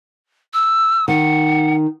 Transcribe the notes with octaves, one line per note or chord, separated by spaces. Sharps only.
E6
D#3 F#5